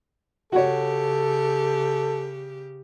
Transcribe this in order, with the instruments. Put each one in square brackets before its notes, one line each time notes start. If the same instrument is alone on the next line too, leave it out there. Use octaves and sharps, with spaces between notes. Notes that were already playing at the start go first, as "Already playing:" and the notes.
[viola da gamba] C#3 G4 [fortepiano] F#4 C#5 [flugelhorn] A4